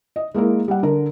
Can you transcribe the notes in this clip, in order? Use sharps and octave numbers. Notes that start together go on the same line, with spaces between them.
D#5
G#3 A#3 E4 A#4
G3 F#5
D3 A#4